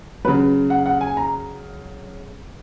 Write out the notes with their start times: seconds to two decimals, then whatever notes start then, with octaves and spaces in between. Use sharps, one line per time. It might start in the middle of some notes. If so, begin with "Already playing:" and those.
0.24 F#3 B4
0.28 C#3
0.70 F#5
0.86 F#5
1.01 G#5
1.17 A#5